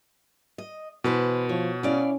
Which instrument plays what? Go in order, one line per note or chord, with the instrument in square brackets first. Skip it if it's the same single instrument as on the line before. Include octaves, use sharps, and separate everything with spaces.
[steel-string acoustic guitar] D#5
[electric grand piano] B2 [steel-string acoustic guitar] E3 B4 C5
[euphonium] F3 [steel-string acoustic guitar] C#5
[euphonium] C#4 [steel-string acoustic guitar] E4 D5 F5